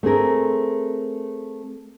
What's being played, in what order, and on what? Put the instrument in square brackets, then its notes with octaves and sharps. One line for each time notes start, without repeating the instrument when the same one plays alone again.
[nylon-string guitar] A3 C4 G#4 A#4